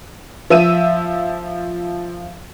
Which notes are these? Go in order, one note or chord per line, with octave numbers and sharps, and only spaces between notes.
F3 E5 E6 D#7